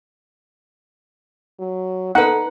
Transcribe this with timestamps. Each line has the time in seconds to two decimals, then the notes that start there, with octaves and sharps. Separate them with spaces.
1.60 F#3
2.15 D#4 A4 B4 F#5